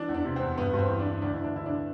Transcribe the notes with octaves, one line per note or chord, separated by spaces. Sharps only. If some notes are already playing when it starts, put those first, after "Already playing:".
Already playing: E3 D4
E2
D4
C3
E2 C4
G2 B3
G2
C4
E3
D4
E3
D2 D4
D2 E4
D4
D3 E4
D3 D4